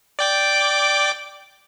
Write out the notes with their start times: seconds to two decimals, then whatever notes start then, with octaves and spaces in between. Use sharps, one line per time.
0.19 D5 G5 D6